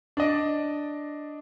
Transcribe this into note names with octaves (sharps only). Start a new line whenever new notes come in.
D4 D5 D#5